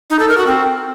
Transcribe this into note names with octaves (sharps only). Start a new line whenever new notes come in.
D#4
A4
A#4
F#4
C4